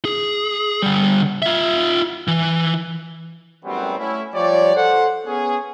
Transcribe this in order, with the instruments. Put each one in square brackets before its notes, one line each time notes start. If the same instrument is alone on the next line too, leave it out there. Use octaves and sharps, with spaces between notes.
[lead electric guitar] G#4
D3 G3
F4 E5
E3
[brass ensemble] F#2 A2 F#3 G3 B3 C4
A3 C#4 E4
F3 G3 G4 C#5 D5
A4 C5 F#5
B3 C#4 G#4